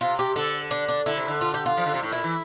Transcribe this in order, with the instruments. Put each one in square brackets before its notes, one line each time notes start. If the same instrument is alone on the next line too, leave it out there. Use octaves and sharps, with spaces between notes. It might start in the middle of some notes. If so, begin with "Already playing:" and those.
[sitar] C3 [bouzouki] F4
[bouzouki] G4
[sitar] D3 [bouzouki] A4
[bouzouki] D4
D4
[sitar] D3 [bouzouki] E4
[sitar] C3
D3
[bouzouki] F4
G4
F4
[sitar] F3
D3
C3
A2
[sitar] A#2 [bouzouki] E4
[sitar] E3